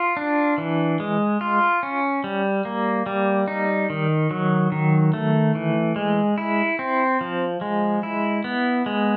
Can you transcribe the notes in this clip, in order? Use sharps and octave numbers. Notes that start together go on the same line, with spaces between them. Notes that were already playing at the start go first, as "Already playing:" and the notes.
Already playing: F4
D4
E3
G#3
F4
C#4
G3
A#3
G3
D#4
D#3
F#3
D#3
A3
E3
G#3
E4
C4
F3
G#3
E4
B3
G#3